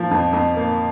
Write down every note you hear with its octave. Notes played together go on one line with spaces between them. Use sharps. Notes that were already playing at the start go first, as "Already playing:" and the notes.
Already playing: F3 A#3
F2
F2
A#3